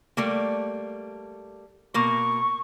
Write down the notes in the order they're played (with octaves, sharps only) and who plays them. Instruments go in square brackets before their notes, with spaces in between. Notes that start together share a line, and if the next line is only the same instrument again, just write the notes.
[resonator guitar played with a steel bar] G3 A3 A#3
[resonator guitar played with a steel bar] B2 A#3 [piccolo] C#6